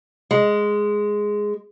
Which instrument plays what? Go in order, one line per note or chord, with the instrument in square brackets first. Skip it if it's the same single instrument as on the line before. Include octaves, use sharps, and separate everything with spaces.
[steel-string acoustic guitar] G#3